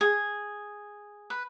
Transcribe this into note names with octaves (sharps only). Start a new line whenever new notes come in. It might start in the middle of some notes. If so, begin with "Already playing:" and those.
G#4
B4